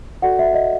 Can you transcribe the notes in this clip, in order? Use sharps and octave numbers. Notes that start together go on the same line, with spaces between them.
F#4 A4 D5 F#5
E5
D#5